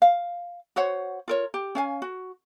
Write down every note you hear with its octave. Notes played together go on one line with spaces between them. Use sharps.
F5
F#4 C5 C#5 F#5
F4 A#4 C#5
G4
C#4 F5 G#5
F#4